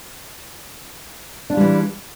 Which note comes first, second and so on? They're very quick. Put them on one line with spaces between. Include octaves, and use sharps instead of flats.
D4 F4 G3 E3